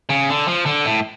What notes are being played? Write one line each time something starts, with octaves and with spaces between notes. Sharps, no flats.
C#3
D3
F3
D3
A2